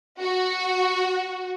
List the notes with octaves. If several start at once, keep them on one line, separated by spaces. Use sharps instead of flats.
F#4